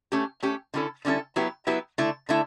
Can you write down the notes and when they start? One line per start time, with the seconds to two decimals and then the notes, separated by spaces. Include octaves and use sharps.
0.12 A3 C#4 G4
0.43 A3 C#4 G4
0.74 D3 G3 C#4 E4 A4
1.05 D3 G3 C#4 E4 A4
1.36 F#3 B3 E4 G4 B4
1.67 F#3 B3 E4 G4 B4
1.98 D3 A3 E4
2.29 D3 A3 E4